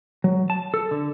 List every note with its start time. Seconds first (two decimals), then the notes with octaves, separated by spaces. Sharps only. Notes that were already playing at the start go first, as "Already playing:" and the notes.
0.24 F#3
0.50 A5
0.74 A4
0.91 D3